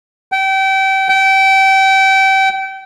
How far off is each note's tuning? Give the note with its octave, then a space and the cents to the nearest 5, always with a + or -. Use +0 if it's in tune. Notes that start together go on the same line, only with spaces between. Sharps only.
G5 -30
G5 -30